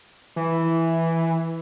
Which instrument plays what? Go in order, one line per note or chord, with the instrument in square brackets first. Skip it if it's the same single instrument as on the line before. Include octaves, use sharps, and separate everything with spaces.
[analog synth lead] E3